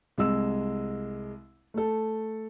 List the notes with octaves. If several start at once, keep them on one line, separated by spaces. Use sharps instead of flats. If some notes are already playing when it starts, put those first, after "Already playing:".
C2 G#3 E6
A3 A4